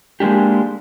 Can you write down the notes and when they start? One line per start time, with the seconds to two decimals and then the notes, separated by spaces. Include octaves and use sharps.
0.20 G#3 A#3 D4 G4